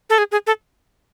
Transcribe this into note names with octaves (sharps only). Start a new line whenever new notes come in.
A4
G#4
G#4
A4